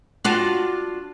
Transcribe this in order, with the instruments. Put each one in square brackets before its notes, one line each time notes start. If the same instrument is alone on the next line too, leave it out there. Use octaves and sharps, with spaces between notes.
[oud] D4 F4 F#4